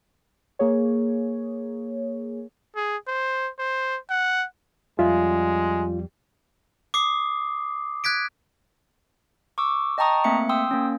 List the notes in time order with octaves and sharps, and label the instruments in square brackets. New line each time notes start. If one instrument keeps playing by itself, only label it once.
[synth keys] A#3 G#4 C#5
[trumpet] G#4
C5
C5
F#5
[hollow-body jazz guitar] F2 G3 E5 [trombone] G#3 [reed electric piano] F4
[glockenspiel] D6 D#6 C7
F#6 G#6 B6 D7
[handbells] C#6 D6 E6
D#5 G5 A5 A#5 C#6 D#6
A3 A#3 C4 E5 C#7
G5 C6 D#6 E6
A#3 C#4